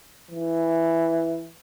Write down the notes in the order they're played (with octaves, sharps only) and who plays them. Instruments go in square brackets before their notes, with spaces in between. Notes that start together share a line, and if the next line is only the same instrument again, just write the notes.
[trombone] E3